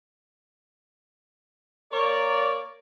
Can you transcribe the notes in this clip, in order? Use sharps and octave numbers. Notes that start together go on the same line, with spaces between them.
A#3 A#4 C#5 D5